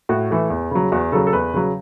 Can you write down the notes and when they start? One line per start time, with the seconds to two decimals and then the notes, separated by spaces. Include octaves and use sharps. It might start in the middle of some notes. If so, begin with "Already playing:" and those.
0.09 A2 F#4
0.30 E3 A3
0.50 E2
0.71 C#3 F#3
0.92 E2 F#4
1.12 C#3 F#3 A4
1.27 A4
1.33 E2 B4
1.54 C#3 F#3